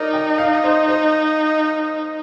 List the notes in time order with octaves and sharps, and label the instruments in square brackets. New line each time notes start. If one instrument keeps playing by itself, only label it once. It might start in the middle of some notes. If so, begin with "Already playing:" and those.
Already playing: [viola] D#4 [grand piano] A#4 D5
[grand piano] D#5 G5
D5 F5
C5 D#5
C5 D#5